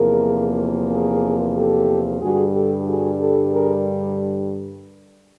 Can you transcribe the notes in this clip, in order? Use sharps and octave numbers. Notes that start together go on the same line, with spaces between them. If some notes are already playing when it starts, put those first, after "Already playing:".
Already playing: E2 C3 F3 A#3 G#4 A#4
G#4 A#4
G4 A4
G2 D3 G3 F#4 G#4
G4 A4
F#4 G#4
G4 A4
G#4 A#4